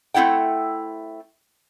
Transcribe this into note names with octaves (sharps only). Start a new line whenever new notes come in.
A3 C4 E4 F#5 G5